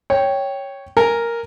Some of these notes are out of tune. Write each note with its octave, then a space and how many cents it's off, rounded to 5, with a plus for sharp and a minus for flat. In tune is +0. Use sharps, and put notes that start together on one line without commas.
C#5 +0 G5 +0
A#4 +0 G#5 +0